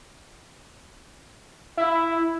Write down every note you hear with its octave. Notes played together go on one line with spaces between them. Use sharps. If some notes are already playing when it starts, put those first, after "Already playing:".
E4